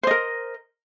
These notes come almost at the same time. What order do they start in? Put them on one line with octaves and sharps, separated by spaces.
C5 D#5 A#4